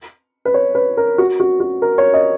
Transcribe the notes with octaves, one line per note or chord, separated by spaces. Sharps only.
B4
C#5
B4
A#4
F#4
F#4
F#4
A#4
C#5
D#5